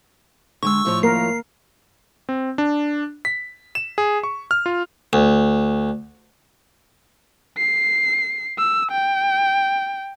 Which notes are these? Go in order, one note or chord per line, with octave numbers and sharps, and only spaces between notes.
D3 G#3 C#6 E6
A2 F3 C#5
A#3 A#4 C7
C4
D4
B6
E7
G#4
C#6
F6
F4
D2
C7
E6
G5